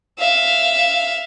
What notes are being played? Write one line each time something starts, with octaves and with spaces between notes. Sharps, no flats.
E5 F5